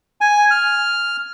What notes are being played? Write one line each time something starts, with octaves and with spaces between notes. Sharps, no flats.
G#5
F6